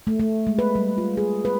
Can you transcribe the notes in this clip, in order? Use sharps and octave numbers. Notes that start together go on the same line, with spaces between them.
A3
A3
G#3
B4
G3
F4
G#4
B4